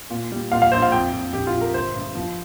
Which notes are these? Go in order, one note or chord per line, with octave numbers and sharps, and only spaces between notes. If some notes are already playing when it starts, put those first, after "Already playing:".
A#2
G3
A#2 F5
F5
A#1 C5
F5
F2 G5
F2
A#1 G4
F4
A#1
A#4
G1 C5
G2
F3